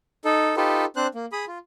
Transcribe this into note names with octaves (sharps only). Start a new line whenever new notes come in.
D#4 A4
D#4 F4 G4 A4 B4
C4 D4 C5 F#6
A#3
G#4 B5 D#6
F4